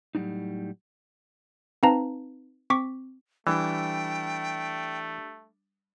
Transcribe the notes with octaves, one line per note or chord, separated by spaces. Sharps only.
A2 F#3 G3 D4 D#4
C4 D#4 B4 F5 A5 A#5
C4 C#6 D6 B6
E3 G3 A3 D4 G5